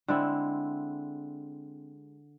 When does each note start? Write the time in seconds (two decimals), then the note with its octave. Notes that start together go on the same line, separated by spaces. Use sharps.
0.08 D3 G#3 C4 E4